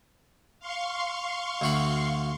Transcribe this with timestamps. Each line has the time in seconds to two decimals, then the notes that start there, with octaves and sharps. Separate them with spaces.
0.59 F5 C6 C#6
1.61 D2 F#4 B5